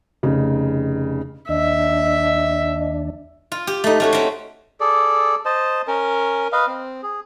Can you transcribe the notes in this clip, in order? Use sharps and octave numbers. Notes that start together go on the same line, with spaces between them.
F1 C#3 D#4
D#2 D4 D#5 E5
F4
G4
A3 D#4
A3 C#4 F#4
C4 C#4
G#4 A4 D5
C5 D#5 A5
C#4 A#4
B4 D#5 F5
C4
G#4